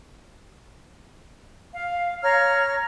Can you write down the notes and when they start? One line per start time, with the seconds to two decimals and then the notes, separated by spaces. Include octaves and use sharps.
1.74 F5
2.23 C#5 A#5 F6